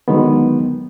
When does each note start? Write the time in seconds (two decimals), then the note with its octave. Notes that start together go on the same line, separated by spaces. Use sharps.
0.08 D3 D#3 F#3 G#3 B3